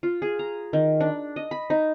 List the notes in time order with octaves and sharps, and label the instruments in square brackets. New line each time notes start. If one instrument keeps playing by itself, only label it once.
[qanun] F4
G#4
A#5
D#3
D4
D#5
B5
D#4